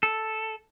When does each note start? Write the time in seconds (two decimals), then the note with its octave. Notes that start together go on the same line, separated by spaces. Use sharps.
0.03 A4